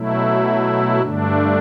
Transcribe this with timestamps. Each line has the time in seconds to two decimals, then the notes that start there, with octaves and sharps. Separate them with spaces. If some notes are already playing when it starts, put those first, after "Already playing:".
Already playing: B2 F#3 A3 E4
1.02 G2 D3 A3 D4